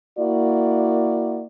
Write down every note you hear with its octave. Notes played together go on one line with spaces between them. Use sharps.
A#3 E4 F#4 D5